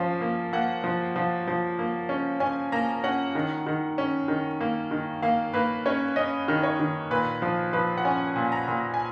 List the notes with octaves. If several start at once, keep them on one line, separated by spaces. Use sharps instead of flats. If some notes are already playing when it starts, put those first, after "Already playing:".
Already playing: F3 C#4 F5
A#3
A#3 F#5
F3
F3
F3
A#3
C#4
C#4 G#5
A#3 A#5
C#4 F#5
D#3
D#3
C#4
D#3
A#3
D#3
A#3 F5
A#3 B4
C#4 C#5
C#4 D#5
D#3
C#5
D#3
A#2 B4
F3 F5
F3 B4
F#5
C#4 G#5
A#2
A#5
A#2
G#5